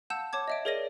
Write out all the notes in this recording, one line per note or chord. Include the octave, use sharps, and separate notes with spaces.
F5 F#5 A5 E6 G6 E7
C#5 A5 D6 G#6
D#5 E5 D7
G#4 A#4 C#5 D5 A#6 D#7